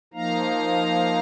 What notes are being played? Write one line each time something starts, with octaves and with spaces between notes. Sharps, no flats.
F3 A#3 D#4 F5 A#5